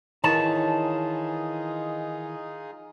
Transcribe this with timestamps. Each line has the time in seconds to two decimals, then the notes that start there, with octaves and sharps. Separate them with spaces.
0.24 D#3 E3 D#4 F4 G#4 C#5 A5